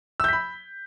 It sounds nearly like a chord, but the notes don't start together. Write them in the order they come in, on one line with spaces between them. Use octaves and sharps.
E6 G6 B6 B5